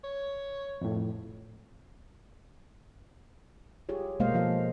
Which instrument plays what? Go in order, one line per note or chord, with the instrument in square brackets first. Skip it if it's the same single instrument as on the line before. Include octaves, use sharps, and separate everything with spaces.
[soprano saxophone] C#5
[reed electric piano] F2 A2
[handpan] F4 G4 G#4 C#5
B2 G#3 A#3 C5 D#5 F5
F3 F4 A4 F5